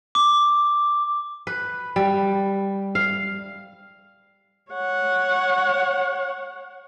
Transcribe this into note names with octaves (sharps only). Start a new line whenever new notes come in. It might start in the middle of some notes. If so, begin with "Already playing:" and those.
D6
B4
G3
F5
C#5 F#5